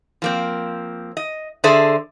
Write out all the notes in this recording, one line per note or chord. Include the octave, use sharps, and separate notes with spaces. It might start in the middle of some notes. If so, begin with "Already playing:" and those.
F3 A#3 C4
D#5
D3 G#4 A4 C5 D5 E5